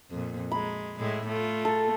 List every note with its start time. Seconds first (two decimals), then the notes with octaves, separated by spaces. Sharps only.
0.11 F2 A#2
0.51 G#3 B5
0.98 A2 G#3 E4
1.27 A3 F4
1.65 A4